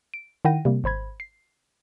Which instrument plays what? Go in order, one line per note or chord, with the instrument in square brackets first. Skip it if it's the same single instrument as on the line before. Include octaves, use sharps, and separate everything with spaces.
[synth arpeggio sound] D7
D#3 E4 F#5 G5 A#6 D#7
C3 G3 A#3
G#1 C5 B5 G#6
C7